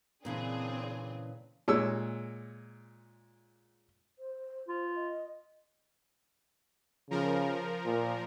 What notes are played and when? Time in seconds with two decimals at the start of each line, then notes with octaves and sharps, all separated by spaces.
0.25 A#2 C#3 E3 C4 D4 G#4
1.68 A#2 G#3 C#5 E6
4.19 C5
4.69 F4
4.96 D#5
7.11 C#3 F3 A#4
7.86 A#2